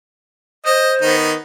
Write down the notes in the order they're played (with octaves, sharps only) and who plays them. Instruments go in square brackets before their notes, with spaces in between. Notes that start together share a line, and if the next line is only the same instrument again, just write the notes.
[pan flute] C5 [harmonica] D#5
[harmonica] D#3 B3 D#4